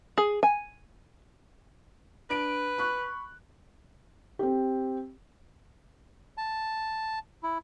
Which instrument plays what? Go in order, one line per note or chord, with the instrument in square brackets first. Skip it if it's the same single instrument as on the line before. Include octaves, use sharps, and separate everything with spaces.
[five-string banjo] G#4
G#5
[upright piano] D4 D7 [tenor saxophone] B4
[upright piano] B5 C#6 F#6
[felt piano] C4 G4
[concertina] A5
E4